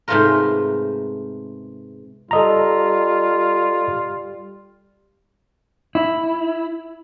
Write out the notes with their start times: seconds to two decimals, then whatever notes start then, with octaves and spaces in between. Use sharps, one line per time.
0.08 G#2 C3 A3 B3 F4 A#4
2.31 G3 F4 A4 D#5 A#5
5.95 E4